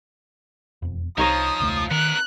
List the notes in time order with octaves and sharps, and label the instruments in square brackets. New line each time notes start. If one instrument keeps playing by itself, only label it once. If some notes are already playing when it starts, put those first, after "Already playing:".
[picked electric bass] E1 F2
[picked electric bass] C2 [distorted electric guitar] F3 [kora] D#4 C#5 D#5 [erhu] D#6
[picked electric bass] E1 C#2 A3
[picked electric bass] D#3 [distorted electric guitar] B3 A#4 [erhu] F#6